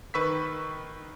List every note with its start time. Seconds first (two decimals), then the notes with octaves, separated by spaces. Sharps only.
0.14 D#3 B4 C#6 E6 B6